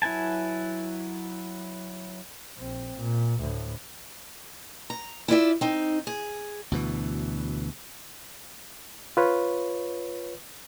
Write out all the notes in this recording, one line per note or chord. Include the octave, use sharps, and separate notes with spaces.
F#3 E4 B4 G#5 A5
A#1 C4
A#2
D2 A2
A#5
E4 F4 D5 E5
C4 D#4
G#4
D2 B2 E3
F4 B4 C#5